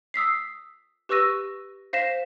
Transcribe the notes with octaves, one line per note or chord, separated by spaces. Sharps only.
D#6 E6 B6 C7
G4 B4 C#6 E6 A#6 D#7
C5 F5 A#6 B6 E7